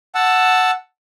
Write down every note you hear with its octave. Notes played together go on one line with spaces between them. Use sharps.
F#5 A5 E6